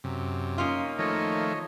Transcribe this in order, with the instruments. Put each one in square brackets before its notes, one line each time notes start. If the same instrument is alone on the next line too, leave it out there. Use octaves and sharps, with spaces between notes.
[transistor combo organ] F#2 C3
[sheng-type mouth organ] A#3 D#4 [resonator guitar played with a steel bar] C#4 F4
[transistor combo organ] D#3 F3 A3 [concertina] C#5 D#5